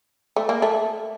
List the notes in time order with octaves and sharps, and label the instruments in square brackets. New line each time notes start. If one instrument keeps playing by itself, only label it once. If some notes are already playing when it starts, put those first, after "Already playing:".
[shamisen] A3
A#3
A3